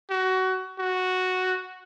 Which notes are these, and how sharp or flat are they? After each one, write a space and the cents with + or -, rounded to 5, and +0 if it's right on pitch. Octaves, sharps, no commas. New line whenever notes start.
F#4 +20
F#4 -5